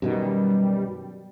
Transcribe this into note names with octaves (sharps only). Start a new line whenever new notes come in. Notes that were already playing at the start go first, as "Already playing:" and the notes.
F#2 B2 D#3 G3